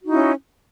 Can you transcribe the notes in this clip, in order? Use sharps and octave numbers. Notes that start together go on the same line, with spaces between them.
C#4 D#4 E4 F#4